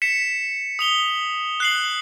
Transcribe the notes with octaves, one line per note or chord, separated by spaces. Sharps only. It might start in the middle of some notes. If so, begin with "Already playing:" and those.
B6 C#7 E7
D#6 F7 G7
F#6 C7 F#7